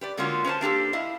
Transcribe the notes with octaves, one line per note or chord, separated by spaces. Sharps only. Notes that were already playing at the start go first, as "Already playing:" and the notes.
G4 B4 D5
D3 G#3 A#3 C#4 F4 F#4
C#4 B4 C5 A5
A#3 D4 G4 A4
E4 D#5 F5